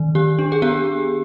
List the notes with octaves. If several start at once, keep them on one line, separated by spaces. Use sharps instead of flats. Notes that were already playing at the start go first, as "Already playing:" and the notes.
Already playing: D#3
D#3 G4
D4
G#4
B3 G4